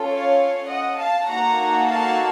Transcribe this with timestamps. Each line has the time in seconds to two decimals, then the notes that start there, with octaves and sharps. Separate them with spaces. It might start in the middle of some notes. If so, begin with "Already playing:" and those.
Already playing: C#4 F4 A4
0.10 C#5 F5
0.69 D#5 F#5
0.98 F5 A5
1.28 A#3 D#4 F#4 A4 F#5 A#5
1.87 F5 A5